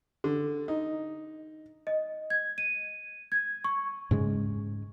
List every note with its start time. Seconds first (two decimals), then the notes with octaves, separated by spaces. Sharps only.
0.24 D3
0.68 D#4
1.87 D#5
2.30 G#6
2.58 D#7
3.32 G#6
3.64 C#6
4.11 G#2 C#3 G#3